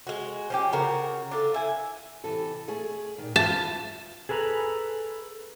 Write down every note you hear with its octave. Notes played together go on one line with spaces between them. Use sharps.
G#3 F#4
F3 C#4 G4
C#3 F#4 A#4
D4 F4 A4
E4 G#5
C3 E3 A4
A3 G#4
A#2 D#3
F4 B4 E5 A5
G#4 A4 B4 G5 A#5